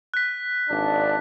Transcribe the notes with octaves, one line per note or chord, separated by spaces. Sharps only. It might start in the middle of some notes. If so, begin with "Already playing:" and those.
F#6 B6
G#1 D4